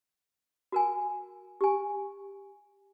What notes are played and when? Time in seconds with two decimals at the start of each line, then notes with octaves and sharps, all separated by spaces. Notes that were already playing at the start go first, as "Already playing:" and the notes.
0.72 F#4 A#4 G#5
1.61 G4 G#5